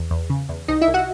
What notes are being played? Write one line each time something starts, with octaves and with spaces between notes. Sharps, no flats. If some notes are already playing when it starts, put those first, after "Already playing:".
Already playing: E2
E2
C#3
E2
C2 D#4 D#5
E4 E5
C2
F#4 F#5